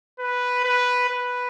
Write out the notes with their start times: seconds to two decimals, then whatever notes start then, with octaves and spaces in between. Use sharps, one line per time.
0.19 B4
0.64 B4
1.09 B4